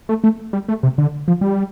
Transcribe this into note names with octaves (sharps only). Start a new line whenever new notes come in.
A3
A3
G3
A3
C3
D3
F3
G3